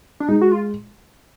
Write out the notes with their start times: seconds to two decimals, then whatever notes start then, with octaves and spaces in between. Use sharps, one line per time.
0.20 D4
0.28 G#3 D#4
0.42 F#4
0.52 F4